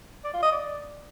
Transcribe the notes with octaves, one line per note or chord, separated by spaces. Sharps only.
D5
F4
D#5
D5